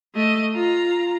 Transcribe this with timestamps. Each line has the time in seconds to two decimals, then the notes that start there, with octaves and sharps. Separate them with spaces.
0.14 A3 D#5
0.54 F4 A#5